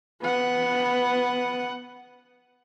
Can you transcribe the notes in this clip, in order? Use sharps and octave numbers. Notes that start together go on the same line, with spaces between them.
B3 F#5